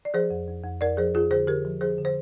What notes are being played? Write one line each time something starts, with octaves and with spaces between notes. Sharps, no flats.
D5
F3 G#4 C5
F2
F2
F2
F2 A#4 D5
F3 G#4 C5
F2 F4 G#4
D3 G#4 C5
D3 G4 A#4
F3
F3 G#4 C5
D3
C5